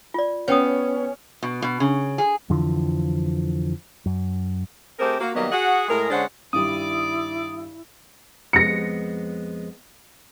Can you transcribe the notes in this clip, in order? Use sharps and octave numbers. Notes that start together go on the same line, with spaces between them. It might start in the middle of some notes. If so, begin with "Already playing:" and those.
F4 D5
B3 C#4 C#5 G5 D#6
B2
B2
C#3
G#4
F2 D3 E3 F3
F#2
A3 C4 G4 G#4 A#4 C5
A#3 F#4
D#3 F#3 G3 A#3 B3 D#5
F#4 G#4 F#5
A2 G#3 G#4 A#4
D3 G#3 C#4 D4 C5 F#5
G2 D#3 G3 E4 D5 D6 D#6
F2 G#3 B3 A#6 C#7